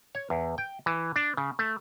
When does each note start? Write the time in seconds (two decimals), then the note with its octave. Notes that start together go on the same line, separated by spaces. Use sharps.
0.15 C#5
0.30 E2
0.58 G5
0.86 E3
1.16 D4
1.37 C#3
1.59 A3